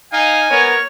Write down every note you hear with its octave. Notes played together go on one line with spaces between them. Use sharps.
D#4 F5 G#5
B3 A#4 C#5